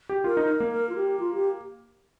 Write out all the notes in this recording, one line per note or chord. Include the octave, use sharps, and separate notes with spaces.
G4
F4 A#4
D#4
A#3
A#4
F4
G4
F4
G4